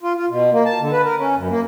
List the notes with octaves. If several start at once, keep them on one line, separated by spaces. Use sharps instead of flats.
F4
F4
B2
A#3
A5
D3
B4
A#4
C#4
F#2
A#3